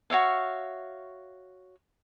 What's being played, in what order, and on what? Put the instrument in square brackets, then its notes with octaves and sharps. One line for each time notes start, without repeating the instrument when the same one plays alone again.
[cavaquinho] F#4 C#5 E5 F5